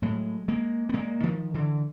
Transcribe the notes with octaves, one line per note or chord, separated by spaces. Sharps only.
A2 F#3 G#3
G#3 A#3
B3
A#2 G#3 A#3
D#3 F3
D3 E3